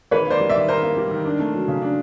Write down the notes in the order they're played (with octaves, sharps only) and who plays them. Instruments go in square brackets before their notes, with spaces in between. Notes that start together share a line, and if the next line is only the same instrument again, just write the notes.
[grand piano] D#3 B4 C#5
A#3 C5 D5
G3
D5 E5
D#3
D#3 A#4 C5
A#3
G3
D#3
D4
A3
F#3
C#3
D4